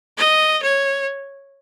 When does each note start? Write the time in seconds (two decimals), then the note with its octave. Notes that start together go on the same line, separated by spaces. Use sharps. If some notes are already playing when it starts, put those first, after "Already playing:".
0.17 D#5
0.63 C#5